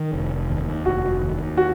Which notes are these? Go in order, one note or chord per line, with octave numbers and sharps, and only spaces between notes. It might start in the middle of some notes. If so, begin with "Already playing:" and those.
Already playing: D#3
F1
D#2
F1 F#4
D#2
F#4